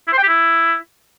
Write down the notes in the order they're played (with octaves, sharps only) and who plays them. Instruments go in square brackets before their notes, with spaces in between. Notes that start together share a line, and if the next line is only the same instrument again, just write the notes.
[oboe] E4
C5
G5
G4
E4